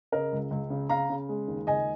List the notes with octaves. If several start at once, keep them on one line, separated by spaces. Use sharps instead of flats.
C#3 A#4 D#5
C#2
C#2
C#3
C#3 F5 A#5
C#3
G#3
D#2
C#2 D#5 G#5